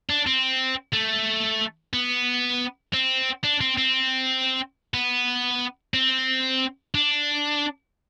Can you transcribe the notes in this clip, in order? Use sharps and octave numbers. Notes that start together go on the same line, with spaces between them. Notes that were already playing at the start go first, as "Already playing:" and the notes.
D4
C4
A3
B3
C4
D4
C4
C4
B3
C4
D4